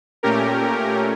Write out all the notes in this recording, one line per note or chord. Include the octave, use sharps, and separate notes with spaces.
A#2 A3 C#4 G4 A#4